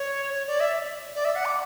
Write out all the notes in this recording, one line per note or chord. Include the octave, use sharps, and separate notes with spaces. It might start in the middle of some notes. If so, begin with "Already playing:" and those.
Already playing: C#5
C#5
D5
E5
D5
E5
F#5
D6